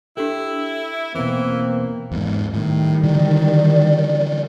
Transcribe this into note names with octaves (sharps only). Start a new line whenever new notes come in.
D4 E4 G4 A4
E2 B2 E3 A#3 C4
E2 G#2
A2 D#3 G3
D3 E3 D5